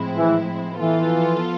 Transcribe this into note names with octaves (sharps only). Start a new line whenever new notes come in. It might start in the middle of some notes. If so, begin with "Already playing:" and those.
Already playing: A2 F3 G#3 C4 E4
E3
E3 F3 B3 F4 A4